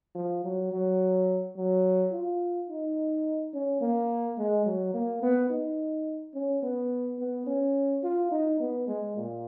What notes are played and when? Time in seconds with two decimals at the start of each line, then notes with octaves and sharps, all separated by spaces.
0.15 F3
0.44 F#3
0.72 F#3
1.56 F#3
2.12 F4
2.69 D#4
3.54 C#4
3.81 A#3
4.38 G#3
4.66 F#3
4.94 A#3
5.22 B3
5.50 D#4
6.34 C#4
6.63 B3
7.19 B3
7.47 C#4
8.04 F4
8.31 D#4
8.60 B3
8.88 G#3
9.16 A#2